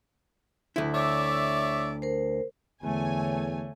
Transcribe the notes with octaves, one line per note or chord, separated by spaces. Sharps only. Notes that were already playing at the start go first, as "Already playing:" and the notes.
D2 E4
C#5 D5 E5 D6
A#4 C5
E2 D3 A3 C#5 G#5